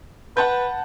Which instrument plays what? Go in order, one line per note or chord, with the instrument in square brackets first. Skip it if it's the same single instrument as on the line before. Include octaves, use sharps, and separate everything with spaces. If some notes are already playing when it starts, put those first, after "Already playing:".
[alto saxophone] B4 [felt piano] F#5 A5 G6